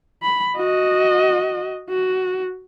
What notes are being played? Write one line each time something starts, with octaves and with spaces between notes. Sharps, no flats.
B5
F#4 D#5
F#4